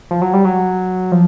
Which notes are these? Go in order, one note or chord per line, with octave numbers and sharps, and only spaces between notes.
F3
F#3
G3
F#3
F3